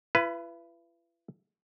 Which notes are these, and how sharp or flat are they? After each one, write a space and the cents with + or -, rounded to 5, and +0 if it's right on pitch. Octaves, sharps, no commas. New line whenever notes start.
E4 +45 B4 +5